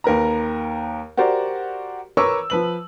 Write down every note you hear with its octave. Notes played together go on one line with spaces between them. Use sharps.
D#2 A#4 B4 A#5
F#4 G4 A#4 C5 D5
A#4 B4 C#5 C#6 D6 E6
F3 B4 F#7